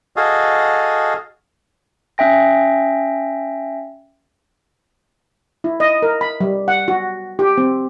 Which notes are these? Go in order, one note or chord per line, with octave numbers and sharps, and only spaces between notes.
F#4 G#4 A4 D#5 F5
C#4 E5 G5 A#6
E4
D#5
A#4
B5
G3
F#5
F#4
G4
C4